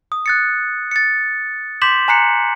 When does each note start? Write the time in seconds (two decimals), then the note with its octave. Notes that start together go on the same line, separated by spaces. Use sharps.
0.12 D#6
0.26 F#6 A6 C#7
0.91 A6 C#7
1.82 C6 D6 G6 B6 E7 F#7
2.08 G#5 A#5 F#6 C7 C#7